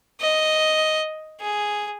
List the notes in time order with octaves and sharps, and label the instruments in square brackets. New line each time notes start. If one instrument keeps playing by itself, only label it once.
[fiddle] D#5
G#4